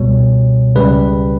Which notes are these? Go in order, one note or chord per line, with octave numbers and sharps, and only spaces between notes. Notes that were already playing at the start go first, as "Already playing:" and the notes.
Already playing: C#2 B2 G3 C#5
C#2 C#3 G3 B4